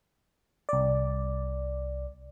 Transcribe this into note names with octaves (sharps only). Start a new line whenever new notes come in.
C2 D5